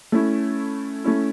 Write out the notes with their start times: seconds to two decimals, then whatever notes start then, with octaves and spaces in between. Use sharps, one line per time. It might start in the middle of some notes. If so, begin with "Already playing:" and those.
0.12 A3 C#4 E4
1.04 A3 C#4 E4